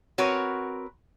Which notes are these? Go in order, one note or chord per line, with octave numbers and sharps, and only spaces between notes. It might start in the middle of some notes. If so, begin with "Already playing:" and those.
C4 F#4 A#4 B4 C#5